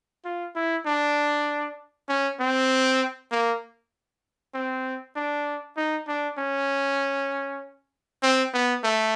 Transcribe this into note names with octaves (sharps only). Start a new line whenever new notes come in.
F4
E4
D4
C#4
C4
A#3
C4
D4
D#4
D4
C#4
C4
B3
A3